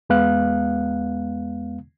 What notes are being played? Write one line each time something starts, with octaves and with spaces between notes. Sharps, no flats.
E2 G#3 B3 F5 F#6